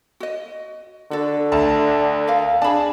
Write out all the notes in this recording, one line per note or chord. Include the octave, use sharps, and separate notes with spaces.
F#4 D#5
D3 F#4 A4
D2 A5
A#4 F5
D4 G#4 A5 B5